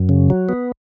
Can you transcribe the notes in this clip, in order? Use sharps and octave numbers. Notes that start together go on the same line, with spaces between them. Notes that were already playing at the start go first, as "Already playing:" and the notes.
Already playing: F#2
C#3
F#3
B3